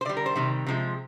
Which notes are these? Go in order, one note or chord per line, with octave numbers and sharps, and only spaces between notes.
C5
D3 G3 D5
A#4
C5
C3 D#3 G3
C3 F3 G#3